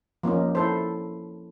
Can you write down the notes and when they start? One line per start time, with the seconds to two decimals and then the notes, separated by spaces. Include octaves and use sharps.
0.23 F3 A#3 C#4 D#4
0.55 E4 A4 C5